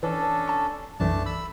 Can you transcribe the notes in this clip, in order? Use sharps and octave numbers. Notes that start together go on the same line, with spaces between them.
E3 C#4 D4 A4
A5 C#6
B1 F#2 E3 A3 D4 A5
B5 E6